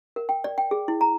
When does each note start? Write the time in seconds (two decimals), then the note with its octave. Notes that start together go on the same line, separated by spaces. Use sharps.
0.16 A#4
0.29 G5
0.44 D5
0.58 G5
0.71 G#4
0.88 E4
1.01 A#5